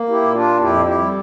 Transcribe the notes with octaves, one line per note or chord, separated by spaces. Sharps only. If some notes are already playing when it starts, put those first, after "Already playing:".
Already playing: A#3
E4 G4
A#2
D4 F4
F2 E4 G4
E4 G4
G3